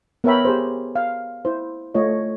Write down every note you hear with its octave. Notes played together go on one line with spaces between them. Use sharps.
B3 A#4 C#5 E5 G5 B5
G4 G#4 C5
F5
E4 C5
A3 F4 C#5 D#5